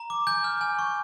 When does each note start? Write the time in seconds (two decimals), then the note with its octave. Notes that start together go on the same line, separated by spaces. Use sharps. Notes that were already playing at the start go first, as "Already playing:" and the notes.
Already playing: A#5
0.10 D6
0.27 G#5 G6
0.44 F6
0.61 G#5
0.79 C#6